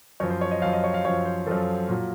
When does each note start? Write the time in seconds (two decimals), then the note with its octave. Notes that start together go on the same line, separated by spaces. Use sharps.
0.20 F#2 F3 C#5
0.30 C5
0.41 C#5
0.51 D#5
0.62 F#2 F5
0.65 F3
0.73 D#5
0.84 C#5
0.94 F5
1.05 F#2 F3 C#5
1.25 C5
1.47 F#2 F3 A4
1.89 A#2 F#3